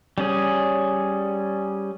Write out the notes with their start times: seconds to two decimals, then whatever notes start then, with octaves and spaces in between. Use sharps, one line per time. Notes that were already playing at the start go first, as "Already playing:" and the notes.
0.18 G3 C#4 G#4